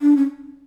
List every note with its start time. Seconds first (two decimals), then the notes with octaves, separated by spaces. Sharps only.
0.02 D4
0.17 C#4